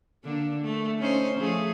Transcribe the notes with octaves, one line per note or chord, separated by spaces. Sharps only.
D3 A#3 D4
A3
C#4 D#4 C5
F3 A3 G#4